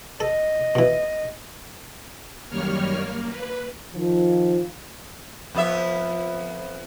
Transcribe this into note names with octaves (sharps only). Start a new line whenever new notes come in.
A4 D#5
B2 E3
F#2 D#3 G3 A#3 C#5 F6
A#3
B4
D#3 F3
F2 B3 E5